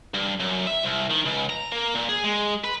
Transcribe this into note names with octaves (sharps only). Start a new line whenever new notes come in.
G2
F#2
E5
C2
D#3
C#2
A#5
A#3
A#2
G#4
G#3
B4